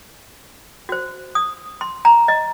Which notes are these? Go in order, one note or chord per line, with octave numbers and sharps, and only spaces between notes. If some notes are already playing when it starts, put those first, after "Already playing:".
F#4 C5
D#6
C6
A#5
D#5